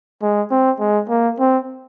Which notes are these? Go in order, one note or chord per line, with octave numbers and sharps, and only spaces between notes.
G#3
C4
G#3
A#3
C4